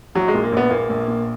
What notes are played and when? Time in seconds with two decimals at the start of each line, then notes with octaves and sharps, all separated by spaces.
0.15 A#1 F#3
0.28 G#3
0.34 A#2
0.43 A#3
0.52 A#1 B3
0.70 A#2 A#3
0.90 A#1
1.07 A#2